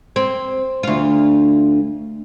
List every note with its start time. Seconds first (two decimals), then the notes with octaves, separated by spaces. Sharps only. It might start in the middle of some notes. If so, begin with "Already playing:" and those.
0.16 C4
0.83 D2 F4